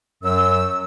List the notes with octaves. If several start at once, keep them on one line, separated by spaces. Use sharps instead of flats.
F#2 F#3 E6